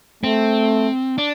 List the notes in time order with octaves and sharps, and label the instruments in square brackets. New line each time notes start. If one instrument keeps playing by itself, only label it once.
[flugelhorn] A3 [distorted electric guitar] C4
[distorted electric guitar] D4